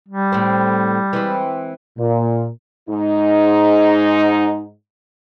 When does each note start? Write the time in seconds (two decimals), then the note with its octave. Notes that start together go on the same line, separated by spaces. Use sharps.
0.08 G3
0.32 A2 C4
1.13 E3 G#3 C4
1.98 A#2
2.89 G#2 D#4